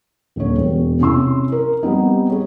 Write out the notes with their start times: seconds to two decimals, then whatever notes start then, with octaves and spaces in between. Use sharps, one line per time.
0.36 D#1 D3 C#5
0.58 E1
1.00 C3 C#4 E4 C6 E6
1.52 A#4
1.83 G3 B3 C4 D#4
2.30 G#4 C#5